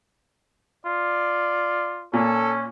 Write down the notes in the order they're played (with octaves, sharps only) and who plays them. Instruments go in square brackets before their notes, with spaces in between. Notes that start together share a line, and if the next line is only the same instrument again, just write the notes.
[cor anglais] F4 [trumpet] D5
[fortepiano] A#2 [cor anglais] C#4 [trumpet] A4